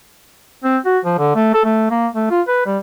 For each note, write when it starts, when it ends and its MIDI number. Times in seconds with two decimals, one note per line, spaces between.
0.64 0.78 60
0.85 0.99 66
1.05 1.17 53
1.19 1.31 50
1.36 1.52 57
1.54 1.61 69
1.65 1.88 57
1.91 2.07 58
2.14 2.29 57
2.31 2.41 65
2.48 2.64 71
2.66 2.78 55